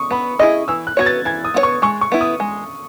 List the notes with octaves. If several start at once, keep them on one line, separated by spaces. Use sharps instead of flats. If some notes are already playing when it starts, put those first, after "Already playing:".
Already playing: C#6 D#6
B3 B5
E4 G#4 D#5 D#6
E3 E6
F#6
B3 F#4 C#5 G#6
A6
E3 G#6
D#6
B3 F#4 C#5
C#6
G#3 C#6
C#6
B3 E4
D#6
G#3